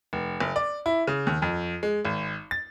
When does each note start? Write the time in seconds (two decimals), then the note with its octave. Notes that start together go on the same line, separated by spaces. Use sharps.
0.13 F1
0.40 F#1
0.56 D5
0.86 E4
1.07 C#3
1.27 D#2
1.42 F2
1.83 G#3
2.05 G#1
2.51 A6